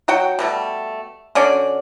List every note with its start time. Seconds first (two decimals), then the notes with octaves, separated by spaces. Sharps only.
0.08 F#3 F#4 F#5 G5
0.39 B2 G3 A3
1.35 D3 C#4 F#4 D5